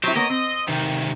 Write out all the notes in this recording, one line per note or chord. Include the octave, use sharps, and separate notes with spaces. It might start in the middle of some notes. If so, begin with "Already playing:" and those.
F#3 E4 G4 C5
A#3 B3 C#5 D#5
C4
C3 D#3